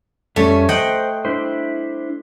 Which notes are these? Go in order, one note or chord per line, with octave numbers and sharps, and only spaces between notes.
F2 G3 A3 C#4
C5 D#5 F#5 G5
D4 E4 C5